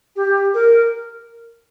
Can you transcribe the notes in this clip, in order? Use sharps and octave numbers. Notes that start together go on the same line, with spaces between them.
G4
A#4